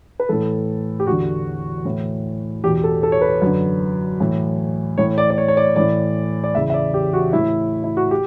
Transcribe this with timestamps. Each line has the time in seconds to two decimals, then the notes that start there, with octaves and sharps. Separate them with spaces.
0.20 B4
0.29 A2 E3 A4
1.00 G4
1.06 E2 D3 F#4
1.85 A2 E3
2.64 E2 B2 G4
2.84 A4
3.03 A4
3.12 C#5
3.22 B4
3.42 F#2 D3
4.20 A2 E3
4.98 A2 E3 C#5
5.18 D5
5.30 D5
5.38 C#5
5.48 C#5
5.57 D5
5.76 A2 E3 D5
6.44 D5
6.55 E2 C#3 E3 E5
6.70 E5
6.74 D5
6.94 G4
7.13 F#4
7.33 A2 E3 E4
7.84 E4
7.97 F#4
8.11 G4